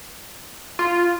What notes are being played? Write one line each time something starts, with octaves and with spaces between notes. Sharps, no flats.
F4